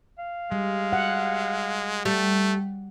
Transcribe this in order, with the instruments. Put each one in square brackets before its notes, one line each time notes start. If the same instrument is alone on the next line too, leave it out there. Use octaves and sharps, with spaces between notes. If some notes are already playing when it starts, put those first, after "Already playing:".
[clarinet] F5
[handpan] G3 [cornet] G#3
[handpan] F#5
[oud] G3 [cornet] A3